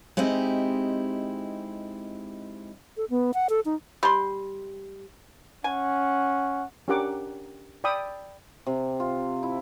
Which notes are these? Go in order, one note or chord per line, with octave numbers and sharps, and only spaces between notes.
G#3 C4 D#4 E4 G4
A4
B3
F#5
A4
D#4
G3 C6
C#4 F#5 G#5
C#4 D4 G4 A#4 F#5 D6
D5 G5 B5 D#6 E6
C3
F4
E4